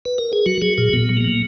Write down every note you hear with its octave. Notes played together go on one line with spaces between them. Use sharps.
B4
A#4
G#4
F#3 F#4
F#3 G#4
A#2 G#4
A#2 B3
F#3
A#3
F#3